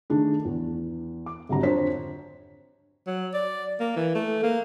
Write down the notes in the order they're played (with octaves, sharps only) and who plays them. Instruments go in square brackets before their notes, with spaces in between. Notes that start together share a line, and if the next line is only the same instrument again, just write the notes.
[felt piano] D#3 A3 D4 G#4
E2
D6
G#1 D3 F#3 G3 A#5
F2 D4 C5 C#5 B6
[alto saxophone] F#3
D5
A#3
E3
A3
A#3